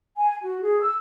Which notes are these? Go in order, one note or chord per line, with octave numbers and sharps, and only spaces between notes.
G#5
F#4
G#4
E6